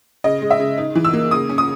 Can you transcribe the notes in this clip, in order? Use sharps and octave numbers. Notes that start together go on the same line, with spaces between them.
C#3 D#5
G#3
E5
C#3
D#4
E3
E6
A#3
C#3 D#6
C#4
D#6